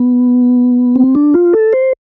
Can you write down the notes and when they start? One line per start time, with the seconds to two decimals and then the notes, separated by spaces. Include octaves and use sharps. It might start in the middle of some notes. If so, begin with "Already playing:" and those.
Already playing: B3
0.96 C4
1.15 D4
1.34 F4
1.53 A4
1.73 C5